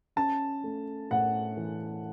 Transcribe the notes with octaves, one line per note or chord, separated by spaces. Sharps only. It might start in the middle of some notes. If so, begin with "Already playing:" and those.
C#4 A5
A3
A2 F#5
E3